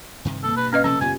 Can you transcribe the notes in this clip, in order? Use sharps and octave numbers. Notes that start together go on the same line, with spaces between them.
G2 C3 D#3
B2 A#3 A4 A5
G2 B4
C#4 B4 D#5 F5
C3 F3 C#4 A4
F#2 C#3 B3 F4 G4 G#5